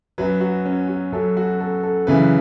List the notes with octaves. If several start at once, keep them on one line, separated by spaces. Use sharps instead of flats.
F#2 F#3 B4
F#4
C#4
F#4
F#2 F#3 A4
F#4
A4
A4
F#2 C#3 E3 B4